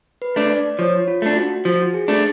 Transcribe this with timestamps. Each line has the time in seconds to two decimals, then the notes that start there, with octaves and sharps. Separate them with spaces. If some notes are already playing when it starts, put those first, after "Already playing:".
0.22 B4
0.36 A3 D4
0.50 D5
0.79 F3 C#5
1.08 F4
1.22 A3 D4
1.36 F#4
1.65 F3 F#4
1.94 G#4
2.08 A3 D4